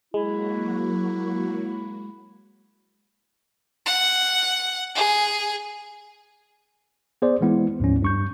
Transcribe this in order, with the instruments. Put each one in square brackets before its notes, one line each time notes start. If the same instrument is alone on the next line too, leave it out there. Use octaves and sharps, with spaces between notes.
[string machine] F#3 A#3 F#4 [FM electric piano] G#3 [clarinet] E4
[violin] F#5
G#4
[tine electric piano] B3 G#4 C5 D5
E3 G#3 B3 E4
D2 G#2 F3 C#4
G2 C#6 G6